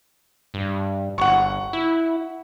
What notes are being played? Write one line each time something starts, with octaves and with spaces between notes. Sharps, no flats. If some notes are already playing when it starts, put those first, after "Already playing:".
G2
G1 F#5 C#6
E4